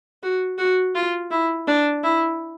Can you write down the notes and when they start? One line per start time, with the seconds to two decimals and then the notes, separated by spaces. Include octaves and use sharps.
0.23 F#4
0.59 F#4
0.95 F4
1.31 E4
1.67 D4
2.03 E4